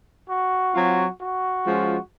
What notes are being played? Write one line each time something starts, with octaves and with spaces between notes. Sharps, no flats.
F#4
F#3 C4 F4
F#4
F3 G#3 C#4 F4